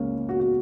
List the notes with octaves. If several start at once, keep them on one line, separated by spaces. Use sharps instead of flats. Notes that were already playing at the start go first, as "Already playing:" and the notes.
Already playing: C#2 C#3 G#3 A#3 C#4
F#4
F#4